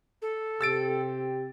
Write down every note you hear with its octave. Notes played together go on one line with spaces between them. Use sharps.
A4
C3 C4 G4 E6 A6 D7